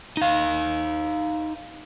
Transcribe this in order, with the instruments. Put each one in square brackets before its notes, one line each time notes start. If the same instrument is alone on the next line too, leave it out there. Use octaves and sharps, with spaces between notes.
[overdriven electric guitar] D#4 F5